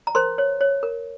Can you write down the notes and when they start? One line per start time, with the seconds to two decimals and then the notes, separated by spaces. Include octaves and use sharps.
0.07 A#5
0.15 A#4 C5 C6
0.38 C#5
0.61 C#5
0.83 A#4